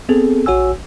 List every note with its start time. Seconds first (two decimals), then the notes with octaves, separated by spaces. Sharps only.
0.09 B3 C4 G#4 A4
0.46 A#1 F#4 C#5 F#5 G#5 E6